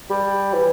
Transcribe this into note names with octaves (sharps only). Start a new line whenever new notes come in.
G3
E3